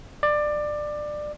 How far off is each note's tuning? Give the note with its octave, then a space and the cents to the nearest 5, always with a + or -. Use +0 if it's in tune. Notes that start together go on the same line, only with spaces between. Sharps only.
D5 +20